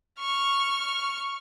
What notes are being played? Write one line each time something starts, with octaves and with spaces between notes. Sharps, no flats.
C#6 F6